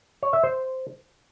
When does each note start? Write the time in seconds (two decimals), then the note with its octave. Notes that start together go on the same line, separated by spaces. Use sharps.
0.23 C#5
0.33 E5
0.43 C5